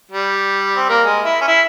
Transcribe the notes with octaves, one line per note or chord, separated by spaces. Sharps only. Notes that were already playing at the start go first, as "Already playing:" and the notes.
G3
C4
A#3
G#3
E4
C#4
E4